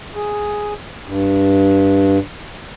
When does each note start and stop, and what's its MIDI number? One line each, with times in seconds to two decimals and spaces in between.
0.15 0.73 68
1.07 2.18 43